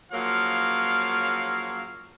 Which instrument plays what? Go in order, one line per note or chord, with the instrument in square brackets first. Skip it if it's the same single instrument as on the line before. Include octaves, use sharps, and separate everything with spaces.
[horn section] C#3 F3 F#3 A#3 C#5 F5